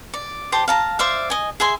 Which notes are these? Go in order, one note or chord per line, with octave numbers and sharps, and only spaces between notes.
D5
G4 C5 A5 D6
F5 A5 A#5
C5 D5 E5 F5
D#5 G#5
G#4 E5 G#5 C6